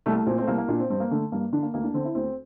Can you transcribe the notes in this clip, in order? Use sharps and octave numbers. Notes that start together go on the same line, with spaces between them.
C2 A3
A3
A#2 C4
A3 C4
C2 A#3
A#3
A#2 D4
C4
G2 C4
A#3
D3 A3
G2 A#3
D3 D4
A#3
D2 A#3
D4
D3 C4
E4
D2 C4